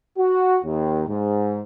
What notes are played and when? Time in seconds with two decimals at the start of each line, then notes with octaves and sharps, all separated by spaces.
0.18 F#4
0.64 D#2
1.08 G#2